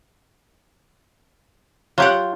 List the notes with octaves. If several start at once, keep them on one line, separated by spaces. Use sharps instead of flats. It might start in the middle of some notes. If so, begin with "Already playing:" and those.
F#3 F4 G4 F#5